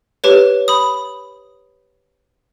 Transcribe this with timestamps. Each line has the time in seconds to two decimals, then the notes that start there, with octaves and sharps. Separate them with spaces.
0.24 G4 B4 C#5
0.68 B5 D#6